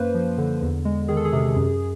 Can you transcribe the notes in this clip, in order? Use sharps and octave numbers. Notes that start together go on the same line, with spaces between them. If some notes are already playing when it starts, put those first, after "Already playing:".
Already playing: F#2 A#3 B4 C5
F3
D3
E2
G#3
D#3 G#4
A4
G#4
C3
F#2